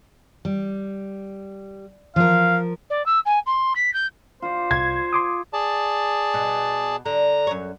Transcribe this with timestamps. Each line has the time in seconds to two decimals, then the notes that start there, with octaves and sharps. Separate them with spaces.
0.45 G3
2.16 F3 A#4 F5
2.90 D5
3.06 E6
3.25 G#5
3.46 C6
3.75 B6
3.93 G6
4.42 F4 C5 D5
4.71 C2 G#6
5.13 C6 D6 D#6
5.53 G#4 D5 A5
6.34 B2
7.06 D3 A#5
7.47 F#2 C#5